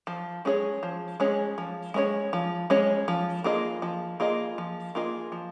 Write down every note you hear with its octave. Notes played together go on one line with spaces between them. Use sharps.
F3
G#3 C#4 G#4 C#5
F3
G#3 C#4 G#4 C#5
F3
G#3 C#4 G#4 C#5
F3
G#3 C#4 G#4 C#5
F3
A#3 F4 G#4 D#5
F3
A#3 F4 G#4 D#5
F3
A#3 F4 G#4 D#5
F3